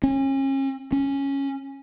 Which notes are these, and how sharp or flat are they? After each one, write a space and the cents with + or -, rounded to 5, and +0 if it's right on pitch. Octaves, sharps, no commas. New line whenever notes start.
C#4 -35
C#4 -5